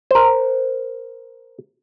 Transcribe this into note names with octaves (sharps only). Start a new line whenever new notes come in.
A#4 C5